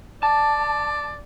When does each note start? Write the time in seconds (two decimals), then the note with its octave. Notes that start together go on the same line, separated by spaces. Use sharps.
0.23 D5 A5